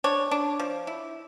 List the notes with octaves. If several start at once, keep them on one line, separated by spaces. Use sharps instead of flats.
D4 C#5
D4
F3
E4